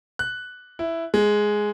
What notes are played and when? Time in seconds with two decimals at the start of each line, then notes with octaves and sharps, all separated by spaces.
0.19 F#6
0.79 E4
1.14 G#3